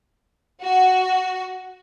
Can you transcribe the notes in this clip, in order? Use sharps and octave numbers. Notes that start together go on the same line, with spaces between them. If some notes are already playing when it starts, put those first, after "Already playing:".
F#4